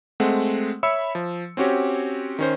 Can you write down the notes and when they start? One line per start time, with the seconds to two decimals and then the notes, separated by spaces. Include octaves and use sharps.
0.20 G#3 A3 C4 F#5
0.83 C#5 E5 B5 E6 C#7
1.15 F3
1.57 C4 C#4 F#4 G4 C#5
2.39 D#3 C#4 C5